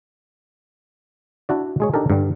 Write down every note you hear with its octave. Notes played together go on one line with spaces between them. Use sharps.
D4 E4 F#4 D5
G#3 G#4 C#5
D4 D#4 G4 A4 A#4
G2 D3 G3